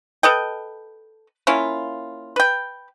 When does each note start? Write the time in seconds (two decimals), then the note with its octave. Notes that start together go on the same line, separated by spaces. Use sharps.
0.23 A4 B4 D#5 G5
1.47 A#3 C#4 E4 F4
2.36 B4 G5